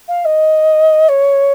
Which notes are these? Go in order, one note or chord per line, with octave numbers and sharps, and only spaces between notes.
F5
D#5
C#5